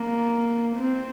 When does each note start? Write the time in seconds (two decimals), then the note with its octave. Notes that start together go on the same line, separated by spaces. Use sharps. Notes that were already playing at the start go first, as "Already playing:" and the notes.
Already playing: A#3
0.76 C4